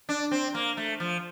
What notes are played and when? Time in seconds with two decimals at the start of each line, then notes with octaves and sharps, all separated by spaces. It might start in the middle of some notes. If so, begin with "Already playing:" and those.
0.09 D4
0.31 C4
0.55 A#3
0.77 A3
1.00 F3